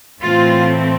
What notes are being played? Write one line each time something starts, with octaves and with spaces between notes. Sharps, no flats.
A2 E3 A3 C4 F4